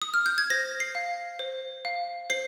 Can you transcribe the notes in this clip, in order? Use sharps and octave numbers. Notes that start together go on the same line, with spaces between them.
D#6
F6
G6
G#6
C5 A#6
C7
F5
C5
F5
C5 C7